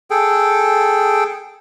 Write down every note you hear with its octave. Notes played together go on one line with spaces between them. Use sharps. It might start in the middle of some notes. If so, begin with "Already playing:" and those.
G#4 A4 G5